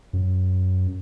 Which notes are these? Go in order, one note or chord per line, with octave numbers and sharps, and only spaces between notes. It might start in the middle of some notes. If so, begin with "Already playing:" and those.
F#2